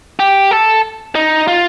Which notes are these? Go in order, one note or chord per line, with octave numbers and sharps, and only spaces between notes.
G4
A4
D#4
F4